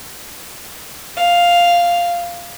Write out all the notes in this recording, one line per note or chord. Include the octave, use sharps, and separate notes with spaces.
F5